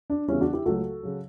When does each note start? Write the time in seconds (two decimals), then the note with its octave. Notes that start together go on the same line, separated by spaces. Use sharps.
0.10 D4
0.28 E2 C#3 G3 C#4 E4
0.41 D4 F#4
0.53 E4 G4
0.65 C#2 C#3 F#3 A3 F#4 A4
1.03 C#3 F#3